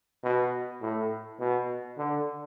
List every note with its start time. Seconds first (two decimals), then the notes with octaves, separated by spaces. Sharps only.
0.24 B2
0.82 A2
1.40 B2
1.98 D3